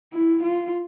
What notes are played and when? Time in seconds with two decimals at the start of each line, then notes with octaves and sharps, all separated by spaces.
0.13 E4
0.43 F4